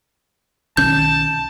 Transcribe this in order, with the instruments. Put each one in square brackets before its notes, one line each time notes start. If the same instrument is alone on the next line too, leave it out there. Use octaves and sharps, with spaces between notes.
[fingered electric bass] B1 D#3 C#4 [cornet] A5 [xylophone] G6